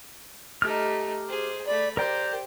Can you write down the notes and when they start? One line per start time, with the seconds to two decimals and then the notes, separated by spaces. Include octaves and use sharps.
0.62 A3 D#4 G4 F6
1.27 G#4 C5
1.67 A3 D5 B5
1.97 G4 A#4 C5 D5 G5